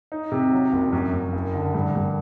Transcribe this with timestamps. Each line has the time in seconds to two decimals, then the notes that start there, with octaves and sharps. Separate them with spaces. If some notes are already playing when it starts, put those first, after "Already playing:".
0.12 D#4
0.32 C3
0.52 F#3
0.72 F#1
0.93 F#2
1.13 F#2
1.33 F#1
1.54 D3
1.75 G2
1.95 G2